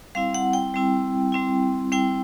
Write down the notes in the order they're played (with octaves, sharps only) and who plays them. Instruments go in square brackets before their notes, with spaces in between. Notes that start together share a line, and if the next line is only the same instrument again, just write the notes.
[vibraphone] G3 C4 E4 F5
F#5
G5
G3 C4 E4
G3 C4 E4
G3 C4 E4 G5